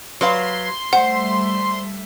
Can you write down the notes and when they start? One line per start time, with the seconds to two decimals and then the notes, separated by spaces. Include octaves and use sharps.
0.21 F#3 B4 F5 C6
0.93 G3 A3 C5 E5 F#5